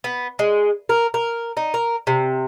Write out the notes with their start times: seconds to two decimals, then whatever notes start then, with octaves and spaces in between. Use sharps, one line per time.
0.04 B3
0.39 G#3
0.89 A#4
1.14 A#4
1.57 D#4
1.74 A#4
2.07 C3